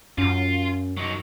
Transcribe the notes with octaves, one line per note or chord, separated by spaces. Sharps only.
F#2 C#4 F4
F#3 D#4